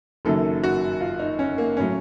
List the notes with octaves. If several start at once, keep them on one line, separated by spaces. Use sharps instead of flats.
F#1 F#2 D#3 F#3 A4
F#4
F4
D#4
C#4
A#3
A2 F#3 C#4